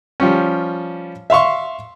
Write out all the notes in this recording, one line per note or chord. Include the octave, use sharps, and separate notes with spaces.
F3 G3 C#4
E5 F5 C6 C#6